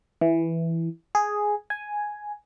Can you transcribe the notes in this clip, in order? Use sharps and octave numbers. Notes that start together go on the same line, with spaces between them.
E3
G#4
G#5